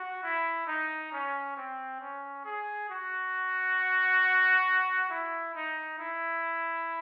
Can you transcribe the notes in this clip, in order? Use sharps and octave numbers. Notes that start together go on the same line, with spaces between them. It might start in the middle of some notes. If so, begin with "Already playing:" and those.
Already playing: F#4
E4
D#4
C#4
C4
C#4
G#4
F#4
E4
D#4
E4